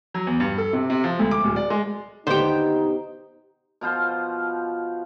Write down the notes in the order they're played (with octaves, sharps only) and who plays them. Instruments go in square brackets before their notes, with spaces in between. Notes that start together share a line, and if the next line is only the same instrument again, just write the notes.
[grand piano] F#3
E2
G2
A4
C3
C3
F3
D2
D6
D1
D5
G#3
[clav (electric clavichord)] D#2 D3 [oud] B3 G4 [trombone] D#4 [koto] C5 G5
[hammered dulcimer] B2 F3 F4 C5